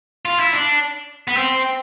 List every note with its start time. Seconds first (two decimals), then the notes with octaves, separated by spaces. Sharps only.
0.25 F4
0.40 E4
0.53 D4
1.28 B3
1.37 C4